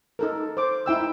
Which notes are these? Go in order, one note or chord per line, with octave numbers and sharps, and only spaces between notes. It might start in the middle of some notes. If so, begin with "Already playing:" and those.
D#4 A4 A#4
C5 D6
D#4 E4 G5 E6